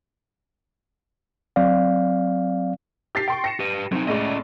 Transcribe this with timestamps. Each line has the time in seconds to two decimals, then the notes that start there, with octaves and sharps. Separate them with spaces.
1.56 F#3 C4 D5 F5
3.15 G4 A6 C7
3.28 G5 C6 C#6
3.44 A#6 C#7 E7
3.60 G4 B4
3.92 F#3 C4 D#4
4.08 A2 G#3 C#4 D5 D#5